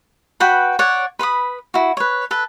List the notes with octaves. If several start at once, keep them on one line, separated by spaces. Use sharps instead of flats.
F#4 B4 G5 B5
C#5 D5 F#5
B4 B5 C6 D#6
E4 F#4
B4 C#5
A4 B4